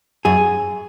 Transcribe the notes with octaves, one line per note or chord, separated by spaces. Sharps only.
F#2 G#4